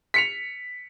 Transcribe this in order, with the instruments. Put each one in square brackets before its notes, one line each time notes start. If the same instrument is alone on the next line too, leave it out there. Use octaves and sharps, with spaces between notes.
[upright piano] B6 C#7 F7